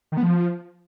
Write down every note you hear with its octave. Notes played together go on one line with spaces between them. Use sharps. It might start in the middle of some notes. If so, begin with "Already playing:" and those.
D#3
B3
F3